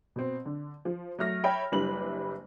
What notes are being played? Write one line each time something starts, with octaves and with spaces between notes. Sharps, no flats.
B2 C4
D3
F3
F#3 A3 F6 A#6
C#5 E5 G5 B5
F#1 G3 D4 E4 B4 F#7